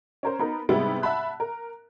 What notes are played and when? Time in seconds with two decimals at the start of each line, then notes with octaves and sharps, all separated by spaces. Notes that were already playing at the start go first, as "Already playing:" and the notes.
0.23 C#4 A#4 C5
0.39 B3 D#4 A#4
0.69 G#2 C3 G3 G#3 B3 E4
1.02 E5 F#5 A5 B5 F#6
1.40 A#4